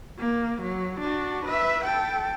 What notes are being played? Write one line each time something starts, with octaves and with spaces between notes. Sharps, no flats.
A#3
F#3
D4 F#4
B4 E5
A4 G5